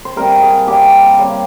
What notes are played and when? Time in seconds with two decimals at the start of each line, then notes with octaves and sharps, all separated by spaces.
0.05 C5
0.16 C3 G3 A#3 A#4
0.42 G#4
0.67 C3 G3 A#3 G4
1.18 C#3 G3 A#3